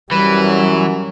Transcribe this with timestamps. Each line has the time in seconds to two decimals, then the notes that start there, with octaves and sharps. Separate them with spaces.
0.11 F#2 E3 G3 B4
0.46 F#3